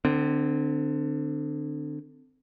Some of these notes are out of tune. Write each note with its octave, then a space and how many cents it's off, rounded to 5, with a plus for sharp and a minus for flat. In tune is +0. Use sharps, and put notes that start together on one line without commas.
D3 +20 C4 -15